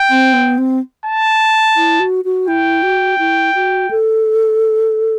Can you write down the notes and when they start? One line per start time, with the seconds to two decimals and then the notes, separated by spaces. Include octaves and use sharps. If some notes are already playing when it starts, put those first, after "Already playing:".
Already playing: G5
0.10 C4
0.33 B3
0.58 C4
1.06 A5
1.76 E4
2.00 F#4
2.25 F#4
2.48 E4 G5
2.83 F#4
3.19 E4
3.55 F#4
3.91 A4